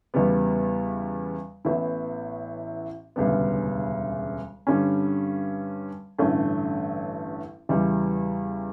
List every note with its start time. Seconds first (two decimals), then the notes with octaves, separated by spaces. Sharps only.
0.14 E2 C#3 G3 B3
1.65 A1 A2 E3 B3 E4
3.16 E1 D2 C#3 G3 B3
4.67 G2 D3 G3 C#4
6.18 A1 G2 D3 A3 C#4
7.69 E2 C#3 E3 G3